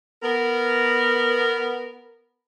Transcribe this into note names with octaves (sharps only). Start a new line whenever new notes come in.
B3 A#4